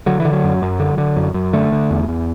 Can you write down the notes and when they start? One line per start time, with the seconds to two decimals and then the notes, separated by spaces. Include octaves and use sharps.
0.06 D3 F#3
0.20 E3
0.25 D3
0.32 F#3
0.44 F#2
0.62 F#2
0.80 D3
0.98 D3
1.16 F#2
1.34 F#2
1.53 D3 A3
1.72 D3
1.90 E2
2.08 E2